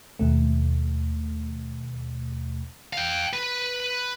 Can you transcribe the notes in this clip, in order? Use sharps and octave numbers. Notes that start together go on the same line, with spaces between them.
D#2 B2 A3
F5 G5
B4